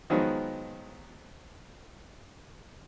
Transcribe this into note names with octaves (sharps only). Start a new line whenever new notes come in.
D#3 F3 F#3 G#3 B3 D#4